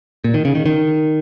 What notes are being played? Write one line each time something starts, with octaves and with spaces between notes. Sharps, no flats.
A#2
D#3
C#3
D#3
D#3